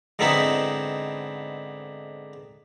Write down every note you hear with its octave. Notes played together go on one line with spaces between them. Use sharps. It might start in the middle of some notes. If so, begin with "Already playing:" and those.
G#2 D3 B3 C4 D#4 E4